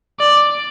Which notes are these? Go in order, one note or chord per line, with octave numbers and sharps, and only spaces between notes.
D5